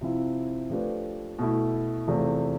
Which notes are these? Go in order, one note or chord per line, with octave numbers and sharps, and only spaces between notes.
C3 F3 C4 E4
F3 A3 D4 G4 B4
B2 A3 E4
E2 C3 F3 A3